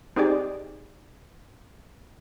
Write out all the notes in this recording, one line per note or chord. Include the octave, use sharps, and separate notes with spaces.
C4 D#4 G4 G#4 D5